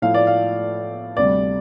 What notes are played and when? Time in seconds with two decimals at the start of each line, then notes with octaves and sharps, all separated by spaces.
0.02 A2 F3 A3 F4 F5
0.14 D5
0.27 F5
1.17 D2 C3 G3 D5